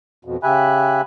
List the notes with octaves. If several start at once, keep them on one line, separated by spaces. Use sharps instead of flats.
F2 B2
C#3 G4 E5 G#5 B5 F#6